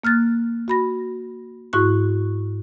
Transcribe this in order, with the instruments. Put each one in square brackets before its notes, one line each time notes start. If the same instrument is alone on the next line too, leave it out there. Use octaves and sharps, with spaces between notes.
[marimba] A#3 F6 F#6 A6
F#4 B5 A#6
G#2 E4 F#4 C#6 F#6